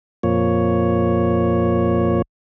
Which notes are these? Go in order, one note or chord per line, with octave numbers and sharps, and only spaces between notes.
F2 A#2 F3 A#3 C#5